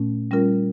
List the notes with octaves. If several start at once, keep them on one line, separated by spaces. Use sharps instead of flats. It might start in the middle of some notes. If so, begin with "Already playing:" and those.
Already playing: A#2 A3 C#4
G3 C#4 F4 A#4